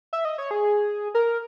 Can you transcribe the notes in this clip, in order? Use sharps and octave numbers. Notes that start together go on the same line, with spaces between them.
E5
D#5
C#5
G#4
A#4